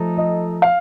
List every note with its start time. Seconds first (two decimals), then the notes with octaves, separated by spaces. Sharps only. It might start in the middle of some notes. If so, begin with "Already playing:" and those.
Already playing: F3 A3 D#4 A4
0.17 D#5
0.62 F5